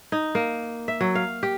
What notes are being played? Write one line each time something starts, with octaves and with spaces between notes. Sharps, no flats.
D#4
A#3
E5
F#3
F5
G4